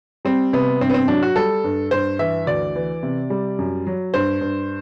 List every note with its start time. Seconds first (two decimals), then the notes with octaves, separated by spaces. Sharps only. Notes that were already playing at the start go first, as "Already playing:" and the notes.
0.25 G3 C4
0.53 C3 B3
0.81 G2 C4
0.90 B3
0.94 C4
1.08 F#3 D4
1.23 F#4
1.36 G3 A4
1.64 G2
1.91 G2 C5
2.19 E3 E5
2.47 D2 D5
2.76 E3
3.03 C3
3.30 G3
3.59 F#2
3.87 F#3
4.14 G2 C5
4.41 G2